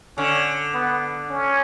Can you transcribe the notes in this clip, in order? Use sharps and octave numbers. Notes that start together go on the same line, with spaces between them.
D3 C#4
B3
C#4